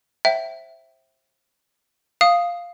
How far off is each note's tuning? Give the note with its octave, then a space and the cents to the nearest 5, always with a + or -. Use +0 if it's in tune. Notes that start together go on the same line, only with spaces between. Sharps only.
C5 +30 E5 +0 G5 -30
F5 +0 D#6 +0